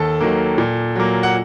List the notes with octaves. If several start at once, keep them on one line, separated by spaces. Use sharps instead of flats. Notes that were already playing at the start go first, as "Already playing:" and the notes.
Already playing: D#2 A4 A5
D#3 F#3 A#3
A#2
F#3 A#3
F#5